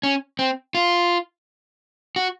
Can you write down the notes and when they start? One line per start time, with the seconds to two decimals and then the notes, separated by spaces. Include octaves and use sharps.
0.03 C#4
0.39 C4
0.75 F4
2.16 F#4